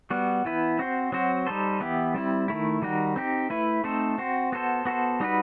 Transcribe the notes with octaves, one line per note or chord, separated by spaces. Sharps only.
G3 B3 F#4
E3 B3 E4 B4
C4 F#4 C5
F#3 C4 F#4 C5
G3 D#4 A4 C5
E3 B3 E4 G4
G3 C4 E4
D#3 A3 E4
D#3 G3 D#4 F#4
C4 D#4 G4
A3 E4 B4
A3 C4 D#4 A4 C5
C4 F#4 C5
B3 F#4 A4 C5
B3 F#4 A4 C5
G3 D#4 F#4 B4